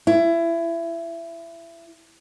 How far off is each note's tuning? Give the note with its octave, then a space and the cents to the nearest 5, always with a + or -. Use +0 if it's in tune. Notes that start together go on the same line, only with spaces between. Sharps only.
E4 +25